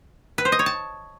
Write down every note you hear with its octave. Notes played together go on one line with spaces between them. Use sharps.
B4
C5
D#5
C#5
A5